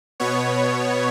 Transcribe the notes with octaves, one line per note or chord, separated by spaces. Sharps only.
B2 B3 C#5